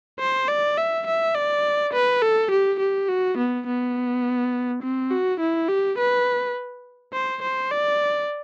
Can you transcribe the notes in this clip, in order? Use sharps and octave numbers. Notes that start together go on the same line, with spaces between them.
C5
D5
E5
E5
D5
B4
A4
G4
G4
F#4
B3
B3
C4
F#4
E4
G4
B4
C5
C5
D5